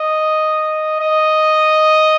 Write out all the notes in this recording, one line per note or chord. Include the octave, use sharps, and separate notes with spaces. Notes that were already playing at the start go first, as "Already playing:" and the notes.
Already playing: D#5
D#5